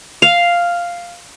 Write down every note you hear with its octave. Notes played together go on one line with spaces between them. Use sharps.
F5